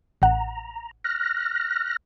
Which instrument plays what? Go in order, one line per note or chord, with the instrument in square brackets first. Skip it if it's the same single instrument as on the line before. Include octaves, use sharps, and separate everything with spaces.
[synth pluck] A1 F#5 [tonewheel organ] A#5
[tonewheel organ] F6 F#6 A#6